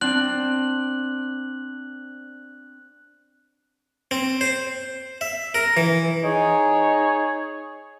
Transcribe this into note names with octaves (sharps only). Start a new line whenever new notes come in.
C4 D4 F#6 F#7
C4
C5
E5
A#4
E3
D#4 G#4 C#5